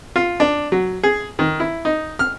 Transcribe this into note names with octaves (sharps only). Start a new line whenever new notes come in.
F4
D4
F#3
G#4
D#3
E4
D#4
F6